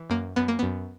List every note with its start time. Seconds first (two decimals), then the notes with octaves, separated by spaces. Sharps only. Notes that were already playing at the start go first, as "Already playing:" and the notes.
Already playing: E3
0.10 F#2 A#3
0.36 F#2 B3
0.48 A#3
0.59 F#2 B3